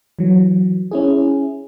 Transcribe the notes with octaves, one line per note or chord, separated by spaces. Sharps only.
E3 F#3
C#4 E4 G#4